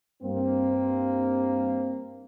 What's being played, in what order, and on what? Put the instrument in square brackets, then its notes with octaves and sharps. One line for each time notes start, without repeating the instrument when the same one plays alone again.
[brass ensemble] G2 A#3 C4